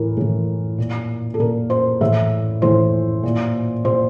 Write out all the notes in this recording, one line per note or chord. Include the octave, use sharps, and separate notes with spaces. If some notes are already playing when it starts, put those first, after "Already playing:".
Already playing: A2 E3 A#4
A2 E3
A#2
A4
A#2 A#4
C5
A2 E3 E5
A2 E3 C5
A#2
A#2 C5